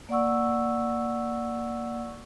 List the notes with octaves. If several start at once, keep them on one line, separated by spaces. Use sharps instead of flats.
A#3 D5 F#5 C#6 E6